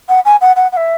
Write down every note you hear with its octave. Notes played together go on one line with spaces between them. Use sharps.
F#5
G#5
F#5
F#5
F#5
E5